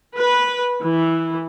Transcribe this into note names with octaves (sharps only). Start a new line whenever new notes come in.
B4
E3